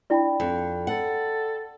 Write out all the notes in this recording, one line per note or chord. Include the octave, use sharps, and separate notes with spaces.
D4 E4 D5 G5 B5
F2
A4 F#5